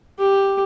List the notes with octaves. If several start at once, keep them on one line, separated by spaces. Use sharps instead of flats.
G4